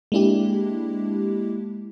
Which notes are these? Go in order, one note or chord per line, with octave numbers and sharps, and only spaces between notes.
G#3 A#3 D4 E4 G4